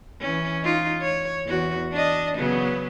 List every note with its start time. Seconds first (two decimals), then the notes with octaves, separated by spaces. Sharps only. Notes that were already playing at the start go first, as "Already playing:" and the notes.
0.21 E3 C#4
0.63 D#4 F4
1.02 C#5
1.46 E2 F#4
1.93 D4 D#5
2.38 C#3 F#3 B3